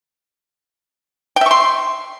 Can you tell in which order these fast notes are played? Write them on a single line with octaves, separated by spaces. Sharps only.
G5 E5 C#6 C6